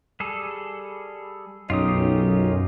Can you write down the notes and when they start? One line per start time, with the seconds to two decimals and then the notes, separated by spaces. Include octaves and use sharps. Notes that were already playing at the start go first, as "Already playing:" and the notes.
0.20 G3 G#4 A4
1.70 B1 F#2 C#4 D#4 F4 G4 D#6